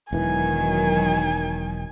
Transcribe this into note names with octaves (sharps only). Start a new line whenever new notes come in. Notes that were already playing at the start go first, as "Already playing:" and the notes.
E1 D#3 E3 F#3 G#5